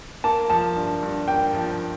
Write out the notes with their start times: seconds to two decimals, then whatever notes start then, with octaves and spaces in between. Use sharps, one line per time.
0.24 A#3 A5
0.50 F3 A5
0.76 G2
1.02 G2
1.28 A#3 G5
1.54 F3